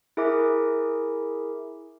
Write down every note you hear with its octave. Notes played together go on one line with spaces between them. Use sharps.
E4 G#4 A#4 E5 G#5 D6